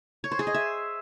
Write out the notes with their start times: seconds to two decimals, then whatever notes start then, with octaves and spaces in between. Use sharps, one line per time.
0.24 C#5
0.32 C5
0.39 G#4
0.47 D#5
0.54 E5